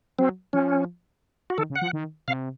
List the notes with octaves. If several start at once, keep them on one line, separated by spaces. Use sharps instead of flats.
F#3 C4
F3 C#4
F#4
D#3 A4
C#3
F#5
F3
D#3
C3 F5